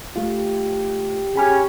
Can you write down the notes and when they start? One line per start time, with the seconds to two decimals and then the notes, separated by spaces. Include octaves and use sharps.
0.16 A3 F4 G4
1.36 C#4 G4 G#4 B5 F6